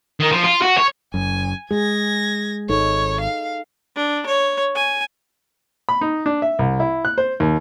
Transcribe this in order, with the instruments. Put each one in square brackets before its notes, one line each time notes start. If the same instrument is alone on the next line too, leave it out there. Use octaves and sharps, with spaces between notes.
[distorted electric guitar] D#3
F3
F4
F#4
C#5
[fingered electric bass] F#1 F#2 [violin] G#5
[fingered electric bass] G#3 [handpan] G#4 [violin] G#6 A#6
[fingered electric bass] G#1 [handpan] D#4 A4 [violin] C#5
[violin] F5
[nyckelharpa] D4
C#5
G#5
[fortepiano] B5
D#4
D4
E5
C2
E4
F#6
C5
D#2